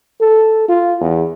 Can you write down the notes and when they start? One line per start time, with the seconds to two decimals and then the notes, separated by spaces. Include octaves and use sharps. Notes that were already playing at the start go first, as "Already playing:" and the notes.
0.20 A4
0.68 F4
1.00 E2